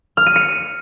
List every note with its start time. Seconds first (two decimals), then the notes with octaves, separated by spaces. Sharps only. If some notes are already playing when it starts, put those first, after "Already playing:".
0.17 F6
0.26 D#7
0.36 C#7